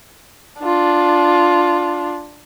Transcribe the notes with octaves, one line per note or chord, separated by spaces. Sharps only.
D4 F4